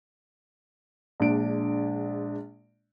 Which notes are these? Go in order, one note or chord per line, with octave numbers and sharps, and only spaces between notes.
A#1 G#3 D4 D7